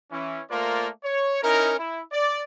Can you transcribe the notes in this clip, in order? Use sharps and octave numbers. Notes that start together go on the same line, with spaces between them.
E3 C#4
A3 A#3 F4 A#4 C5 D5
C#5
C#4 D#4 E4 A#4
E4
D5